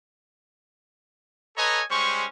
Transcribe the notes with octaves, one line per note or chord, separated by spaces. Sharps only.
A4 B4 C#5 D#5 G#5 A#5
G3 G#3 C#4 C5 C#6